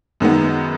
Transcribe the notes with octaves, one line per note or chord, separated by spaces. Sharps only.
F#2 D#3 G#3 B3